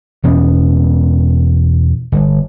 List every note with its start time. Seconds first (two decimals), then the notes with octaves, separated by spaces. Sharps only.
0.24 E2 B2 B3 C#4
2.12 G1